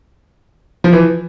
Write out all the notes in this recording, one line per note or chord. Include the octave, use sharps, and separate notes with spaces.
F3
E3